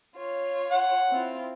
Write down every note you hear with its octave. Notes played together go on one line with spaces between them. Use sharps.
F4 C#5
F#5
C4 E4 F4